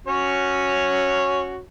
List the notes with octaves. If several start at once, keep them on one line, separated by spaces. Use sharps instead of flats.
C#4 F#4 C#5